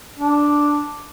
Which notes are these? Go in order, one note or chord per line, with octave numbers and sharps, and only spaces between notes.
D4